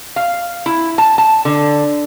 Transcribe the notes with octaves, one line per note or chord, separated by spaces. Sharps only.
F5
E4
A5
A5
D3